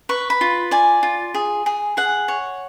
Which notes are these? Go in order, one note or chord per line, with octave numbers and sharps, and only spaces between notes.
B4 C#6
B5
F4
D5 G#5
F4
G#4
G#4
G#4 F#5
C#5